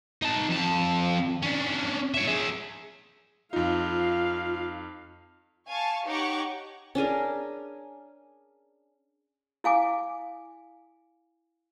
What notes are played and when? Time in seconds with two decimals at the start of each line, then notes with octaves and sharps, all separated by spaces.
0.22 D#4 A5
0.50 F2 A5
1.43 C#4 D4
2.14 C#5 E5
2.28 G#4 E5
3.53 F2 D#4 F4 F5
5.69 F5 G#5 A5 C#6
6.05 D#4 G4 C#5 F#5 C#6 D6
6.95 C#4 D4 G#4 A#4
9.64 E4 F5 G#5 D6